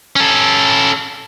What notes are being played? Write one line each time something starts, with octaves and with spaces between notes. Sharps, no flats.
C#4 A4